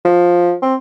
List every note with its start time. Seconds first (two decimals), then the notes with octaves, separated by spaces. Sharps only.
0.05 F3
0.62 C4